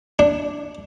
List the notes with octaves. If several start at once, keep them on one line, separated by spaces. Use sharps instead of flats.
D4